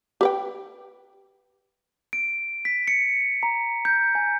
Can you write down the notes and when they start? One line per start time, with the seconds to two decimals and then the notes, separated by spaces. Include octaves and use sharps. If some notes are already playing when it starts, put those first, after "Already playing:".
0.21 G4 B4 G5
2.13 D7
2.65 B6
2.88 C#7
3.43 A#5
3.85 G6
4.15 G#5